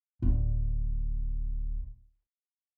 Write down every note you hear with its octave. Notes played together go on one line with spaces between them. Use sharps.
D1 D3